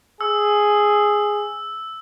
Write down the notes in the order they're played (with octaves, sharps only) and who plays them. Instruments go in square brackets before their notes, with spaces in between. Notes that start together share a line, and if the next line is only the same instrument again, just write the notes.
[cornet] G#4 [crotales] E6